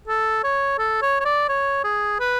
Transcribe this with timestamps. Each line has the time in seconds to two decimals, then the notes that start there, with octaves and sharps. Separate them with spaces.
0.08 A4
0.44 C#5
0.79 A4
1.02 C#5
1.20 C#5
1.25 D5
1.49 C#5
1.84 G#4
2.20 B4